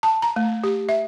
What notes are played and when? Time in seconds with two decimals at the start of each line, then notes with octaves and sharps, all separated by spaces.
0.03 A5
0.22 A#5
0.36 A3
0.64 G4
0.89 E5